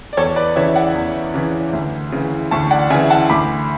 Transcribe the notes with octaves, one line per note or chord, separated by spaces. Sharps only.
D5
E2 A4 C#5
B4 D5
C#3 E3 C#5 E5
D5 F#5
E2
C#3 E3
D2
C#3 E3
D2 A5 C#6
D5 F#5
C#3 E3 E5 G#5
F#5 A5
D2 B5 D6